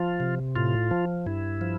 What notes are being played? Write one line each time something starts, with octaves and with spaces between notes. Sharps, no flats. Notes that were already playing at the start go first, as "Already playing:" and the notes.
Already playing: F3 F4
C3
A2 F4
F3
G2 E4
F3